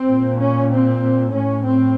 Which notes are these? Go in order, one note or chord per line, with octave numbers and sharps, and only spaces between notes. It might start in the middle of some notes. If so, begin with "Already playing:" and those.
Already playing: C4
A#2
C#4
C4
A2 C#4
C4